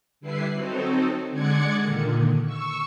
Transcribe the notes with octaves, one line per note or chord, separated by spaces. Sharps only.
D3 G3 E4 B4 C7
F#3 C4 D#4 A4
D3 G#3 D5 F#5 G#6 C#7
A#2 D3 D#3
C#6 E6